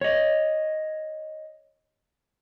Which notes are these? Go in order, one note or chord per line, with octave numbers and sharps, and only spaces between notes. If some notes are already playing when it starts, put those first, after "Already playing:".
C#5 D#5